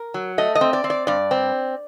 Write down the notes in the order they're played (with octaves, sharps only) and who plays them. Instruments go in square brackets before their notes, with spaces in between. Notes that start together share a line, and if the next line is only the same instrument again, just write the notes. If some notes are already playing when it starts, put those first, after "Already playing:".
Already playing: [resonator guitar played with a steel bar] A#4
F#3
A3 D#5
D#5
C4
D5
C4
D5
G2 D5
C4